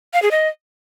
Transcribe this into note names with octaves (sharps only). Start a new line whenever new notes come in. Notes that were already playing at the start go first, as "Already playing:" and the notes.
F5
G#4
D#5